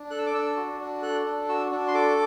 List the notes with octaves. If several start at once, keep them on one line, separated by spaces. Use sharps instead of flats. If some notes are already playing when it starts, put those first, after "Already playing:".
Already playing: D4
A4 F#6
E6
D6
D4 E6
F#4
D4
A4 F#6
D4
F#4 E6
D4
C6
A4 D6